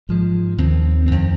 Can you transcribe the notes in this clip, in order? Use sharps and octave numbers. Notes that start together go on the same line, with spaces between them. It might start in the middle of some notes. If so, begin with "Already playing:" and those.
G#2 F3 G#3
D#2 D#3 C4
F2 D#3 C4